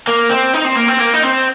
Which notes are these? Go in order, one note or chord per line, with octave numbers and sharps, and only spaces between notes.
A#3
C4
D#4
C4
A#3
C4
A#3
D#4
C4